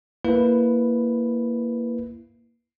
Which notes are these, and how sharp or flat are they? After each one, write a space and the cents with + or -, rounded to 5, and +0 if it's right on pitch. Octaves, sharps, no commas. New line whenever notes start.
A#3 +0 E4 +10 B4 +0